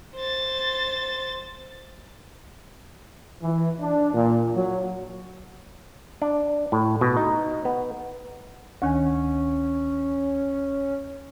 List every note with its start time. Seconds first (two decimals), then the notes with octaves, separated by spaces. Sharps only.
0.16 C5 A6
3.42 E3
3.81 D4
4.14 A#2
4.55 F#3
6.22 D4
6.72 A2
7.01 B2
7.17 D#4
7.65 B3
8.82 D2 D#3 C#4 G#5